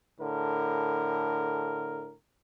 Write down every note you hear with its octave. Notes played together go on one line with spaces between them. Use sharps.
A2 D3 A#4